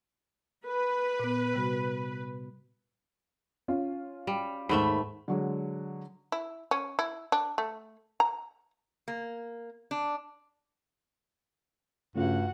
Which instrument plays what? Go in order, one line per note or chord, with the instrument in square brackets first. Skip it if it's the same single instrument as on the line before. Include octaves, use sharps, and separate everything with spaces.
[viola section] B4
[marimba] A#2 B3
C3 G3 F#4
[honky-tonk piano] C#4 F4
[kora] G3
[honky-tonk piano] D#2 B5 [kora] G#2 A3 E5
[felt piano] D3 F#3 G#3
[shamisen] E4
C#4
E4
D4
A3
A#5
[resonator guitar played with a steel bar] A#3
D4
[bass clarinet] G2 [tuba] C#3 [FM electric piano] A3 F4 [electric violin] F#4 F#5